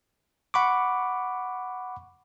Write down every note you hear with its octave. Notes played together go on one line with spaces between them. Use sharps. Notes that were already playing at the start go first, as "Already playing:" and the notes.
F#5 B5 C#6 D6